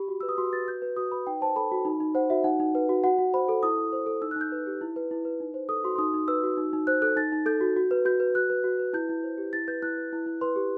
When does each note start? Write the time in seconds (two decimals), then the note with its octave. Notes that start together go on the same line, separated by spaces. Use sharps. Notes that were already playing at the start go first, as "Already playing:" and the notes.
Already playing: G4 B5
0.08 F#4
0.21 B4 E6
0.29 D#6
0.38 F#4 C6
0.52 B4 A6
0.67 F#4 G6
0.82 B4
0.97 F#4 D#6
1.12 B4 B5
1.27 D#4 G5
1.41 C5 A5
1.56 A4 B5
1.72 F#4
1.85 D#4
2.00 D#4
2.15 C5 F#5
2.30 F#4 E5
2.44 D#4 F#5
2.60 D#4
2.75 B4
2.89 F#4
3.04 F#4 F#5
3.18 F#4
3.34 C5 B5
3.49 A4
3.63 E4 D#6
3.78 E4
3.93 C5
4.06 A4
4.22 D#4 E6
4.31 F#6
4.36 D#4
4.41 G6
4.52 B4
4.67 G4
4.81 E4
4.96 B4
5.11 E4
5.25 B4
5.40 D#4
5.54 C5
5.69 A4 D#6
5.84 F#4 C6
5.95 C6
5.98 D#4 D#6
6.14 D#4
6.28 B4 E6
6.43 F#4
6.57 D#4
6.73 D#4
6.87 C5 F#6
7.02 A4 F#6
7.16 D#4 A6
7.32 D#4
7.46 A4 G6
7.61 F#4
7.76 F#4
7.91 B4
8.05 F#4 G6
8.20 B4
8.35 F#4 F#6
8.50 B4
8.64 F#4
8.79 B4
8.93 E4 G6
9.09 E4
9.23 C5
9.38 G4
9.53 E4 A6
9.68 B4 G6
9.82 E4 F#6
9.97 B4
10.13 E4
10.26 E4
10.41 B4 C6
10.56 G4